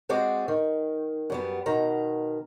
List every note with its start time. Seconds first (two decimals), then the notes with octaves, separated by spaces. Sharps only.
0.09 G#3 C4 F#4 G#4 D5
0.48 D#3
1.30 F#2 G3 B3
1.66 B2 D#3 A#5